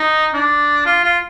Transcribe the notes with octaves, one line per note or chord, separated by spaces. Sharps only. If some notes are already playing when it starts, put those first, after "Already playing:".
Already playing: D#4
D4
F4
F4